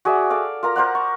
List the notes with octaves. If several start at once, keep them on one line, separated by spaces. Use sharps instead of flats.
F#4 G#4 D5 E5
A4 D5 F5
F4 A#4 A#5
A#4 C5 D5 F#5
C#6